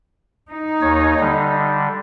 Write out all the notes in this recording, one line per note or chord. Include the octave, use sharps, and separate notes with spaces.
D#4
D#2 C#5
D3 G3